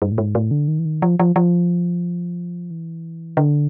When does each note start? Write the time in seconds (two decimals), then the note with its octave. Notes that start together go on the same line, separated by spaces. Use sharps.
0.02 G2
0.12 A2
0.18 G#2
0.35 A2
0.51 D3
0.68 D#3
0.79 E3
0.85 D#3
1.02 F3
1.19 F3
1.36 F3
2.71 E3
3.37 D3